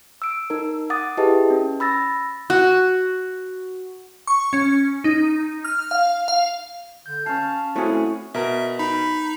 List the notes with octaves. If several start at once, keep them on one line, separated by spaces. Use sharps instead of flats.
E6 D7
D#4 A#4
F#5 D6 D#6 A6
E4 G4 G#4 B4 D#5 A5
C#4
B5 E6 A6 A#6
F#4
C#6
C#4
D#4
F6
F5
F5
D3 G6
C#4 F5 A5 C7
A3 C4 C#4 E4 F#4 G#4
B2 A#4 E5
D#4 B5